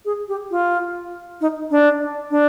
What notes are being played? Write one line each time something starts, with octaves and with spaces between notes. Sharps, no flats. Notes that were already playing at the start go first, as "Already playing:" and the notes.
G#4
G4
F4
D#4
D4
D4